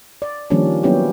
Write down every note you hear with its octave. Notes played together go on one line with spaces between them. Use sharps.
D5
D#3 F3 G3 A#3 C#4 D4
F#3 A#3 B3 C#4 E4 G4